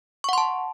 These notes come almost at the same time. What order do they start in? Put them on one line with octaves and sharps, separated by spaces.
C#6 F#5 C6 A5